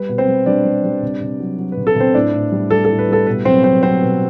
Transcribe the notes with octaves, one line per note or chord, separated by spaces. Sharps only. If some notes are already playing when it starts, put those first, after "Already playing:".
Already playing: G3 B4
B2
C4 C5
G3
G3 D4 D5
G3
G3
C3
C3
F#3
F#3
B4
C3
A4
C3 C4 C5
A2 D4 D5
A2
G3
G3 A4
A2 A4
B4
G3 A4
B2 B4
F#3 C4 C5
F#3 C4 C5
F#3 C4 C5
B2